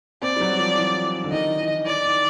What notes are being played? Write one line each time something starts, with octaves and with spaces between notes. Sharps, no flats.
C4 D5
G3
F#3
F3
E3
D3
D#3 D#5
E3
E3 D5
D#3